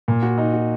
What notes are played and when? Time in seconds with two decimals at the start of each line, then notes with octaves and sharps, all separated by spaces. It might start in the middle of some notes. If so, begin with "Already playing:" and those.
0.08 A#2
0.22 F#4
0.38 D#4
0.53 F#4